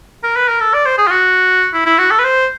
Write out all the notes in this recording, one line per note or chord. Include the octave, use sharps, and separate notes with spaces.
A#4
B4
A#4
A4
D5
C5
G#4
F4
F#4
E4
E4
F#4
A4
B4
C5